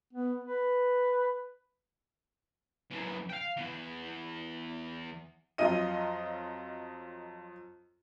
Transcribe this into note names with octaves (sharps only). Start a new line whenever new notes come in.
B3
B4
F#2 E3
F5 G5
E3 B3
F2 F#3 F4 D#5 D#7